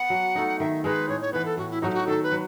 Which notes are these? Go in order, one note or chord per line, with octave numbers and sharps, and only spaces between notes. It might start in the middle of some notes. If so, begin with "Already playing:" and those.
Already playing: B3 F#5
F#3
A3 D#4
D#3 E5
G#3 D#4 G#4 B4
A2 C#5
C#5
E3 B3 B4
A4
A2 F#4
E4
F#3 A3 D#4 F#4
E4
F#4
D#3 A4
B4
F#3